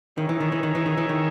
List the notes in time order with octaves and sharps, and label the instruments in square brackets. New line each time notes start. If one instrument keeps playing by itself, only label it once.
[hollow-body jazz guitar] D#3 [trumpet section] D#4 G#4 C#5 E5
[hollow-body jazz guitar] E3
D#3
E3
D#3
E3
D#3
E3
D#3